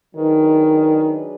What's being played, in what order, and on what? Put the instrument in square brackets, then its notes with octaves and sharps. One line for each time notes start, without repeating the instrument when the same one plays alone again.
[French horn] D#3 [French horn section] F#3 D4 G#4 B4